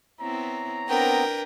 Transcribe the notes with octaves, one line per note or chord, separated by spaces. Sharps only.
B3 C4 E4 C#5 A#5
B3 C4 D4 A#4 B4 G5